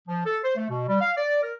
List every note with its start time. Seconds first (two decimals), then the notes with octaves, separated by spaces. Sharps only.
0.08 F3
0.26 A4
0.44 C5
0.56 A3
0.70 B2
0.88 G3
1.01 F5
1.17 D5
1.43 A#4